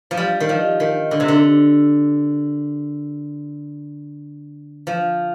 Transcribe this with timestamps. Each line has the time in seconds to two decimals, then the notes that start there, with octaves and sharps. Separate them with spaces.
0.11 F3
0.17 G3
0.40 D#3
0.49 F3
0.80 D#3
1.11 D3
1.20 C3
1.28 D3
4.87 F3